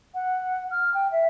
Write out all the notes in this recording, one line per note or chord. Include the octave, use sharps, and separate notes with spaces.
F#5
F6
G5
E5